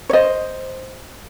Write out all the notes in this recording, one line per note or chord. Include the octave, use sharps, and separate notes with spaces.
C#5
C5 D#5